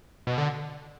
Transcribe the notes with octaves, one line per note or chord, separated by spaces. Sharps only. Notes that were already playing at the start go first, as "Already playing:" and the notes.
B2
D3